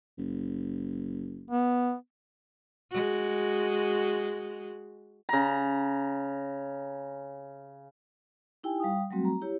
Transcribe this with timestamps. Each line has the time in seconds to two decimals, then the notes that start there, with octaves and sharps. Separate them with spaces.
0.18 F#1
1.51 B3
2.91 G#3 F#4
5.29 C#3 A#5
8.63 D#4 E4 G4 G5 G#5
8.80 G3 F5 G5 D#6
9.11 F#3 G3 A3 C4 F#4
9.25 A#5
9.41 E4 G4 C#5